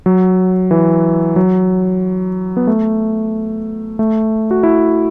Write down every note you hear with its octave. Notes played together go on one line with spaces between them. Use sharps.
F#3
E3
F#3
B3
A3
A3
F#4
E4